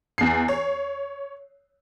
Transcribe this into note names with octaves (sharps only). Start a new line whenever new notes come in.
E2 C7
C#5